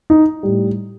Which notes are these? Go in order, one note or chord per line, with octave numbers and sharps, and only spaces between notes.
D#4
A2 G3